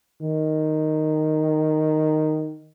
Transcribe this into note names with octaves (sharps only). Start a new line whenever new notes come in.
D#3